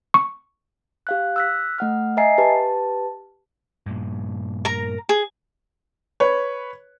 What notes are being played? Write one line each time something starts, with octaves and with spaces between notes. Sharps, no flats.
C#6
G4 F5 F#6
E6 F#6 B6
A3 F#5 F6
D#5 E5 G#5 A#5 C7
G4 B4 A5
G2 A#2
A#4 A#5
G#4
B4 C#5